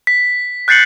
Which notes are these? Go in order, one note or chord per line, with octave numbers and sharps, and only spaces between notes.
B6
F#6 G6 A6 C7 C#7 F#7